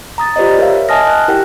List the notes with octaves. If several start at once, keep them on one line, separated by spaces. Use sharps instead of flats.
A#5 D#6 A6
F4 G4 C5 D5 D#5
A#4 C#5 E5 F5
D#5 G#5 A5 D#6 F6 A#6
F#6
E4 G4 A#4 F#5 G5